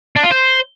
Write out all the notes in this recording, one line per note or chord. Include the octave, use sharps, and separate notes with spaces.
D4
F4
C5